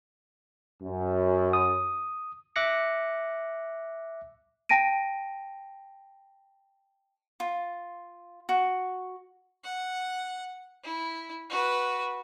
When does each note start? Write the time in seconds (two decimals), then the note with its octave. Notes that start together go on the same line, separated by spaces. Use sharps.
0.83 F#2
1.53 D#6
2.56 E5 D6 F#6 A#6 C#7
4.69 G5 A5 A#6 D7 D#7
7.40 F4
8.49 F#4
9.64 F#5
10.84 E4
11.50 F#4 B4